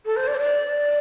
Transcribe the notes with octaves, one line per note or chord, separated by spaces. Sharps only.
A4
C5
D5
C5
D5